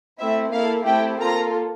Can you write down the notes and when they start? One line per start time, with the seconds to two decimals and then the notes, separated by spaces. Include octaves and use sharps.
0.19 A3 C4 E4 E5
0.52 A#3 E4 A4 F5
0.86 A3 C4 E4 G4 G5
1.19 A#3 F4 A4 A#5